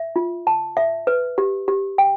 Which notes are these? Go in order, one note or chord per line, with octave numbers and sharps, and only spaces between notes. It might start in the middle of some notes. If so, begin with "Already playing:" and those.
Already playing: E5
F4
A5
E5
B4
G4
G4
G5